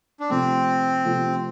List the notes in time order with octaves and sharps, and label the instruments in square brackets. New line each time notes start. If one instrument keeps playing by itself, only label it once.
[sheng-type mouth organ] D4
[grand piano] C3 F3 A3 [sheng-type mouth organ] C4
[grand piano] C3 F3 A3